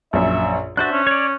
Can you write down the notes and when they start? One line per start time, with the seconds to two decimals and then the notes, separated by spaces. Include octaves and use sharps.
0.13 A#1 F#2 E5
0.77 D4 F#4 C5 E5 F#6 A6
0.91 C#4
1.07 C#5 D5